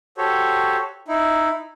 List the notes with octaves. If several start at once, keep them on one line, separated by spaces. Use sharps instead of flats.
F#4 G4 A4 C5 C#5
D#4 E4